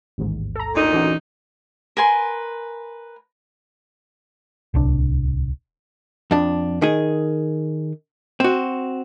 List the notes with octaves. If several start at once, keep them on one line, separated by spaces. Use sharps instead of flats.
A1 D#2 G#2
A4 A#5
D2 A#2 D#4
E3 C#4 F#4
A#4 B4 G#5 C6
D1 C2 D4
F2 D4
D#3 G#4
C4 F#4